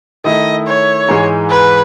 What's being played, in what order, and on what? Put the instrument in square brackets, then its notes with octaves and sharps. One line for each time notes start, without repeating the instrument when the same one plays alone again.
[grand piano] D#3 A3 E4 [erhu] D#5
[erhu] C#5
[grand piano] G#2 E3 G#3
[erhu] B4